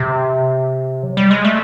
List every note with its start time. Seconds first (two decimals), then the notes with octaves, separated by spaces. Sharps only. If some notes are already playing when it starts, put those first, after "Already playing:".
Already playing: C3
1.03 F#3
1.17 G3
1.31 G#3
1.45 A3